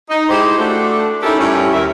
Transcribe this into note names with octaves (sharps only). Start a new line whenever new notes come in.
D#4
G#3 E4 G4 C5
A3 D4 F#4
C#4 D#4 E4 G4 A4 A#4
G2 C#4 E4
D#2 A#4 E5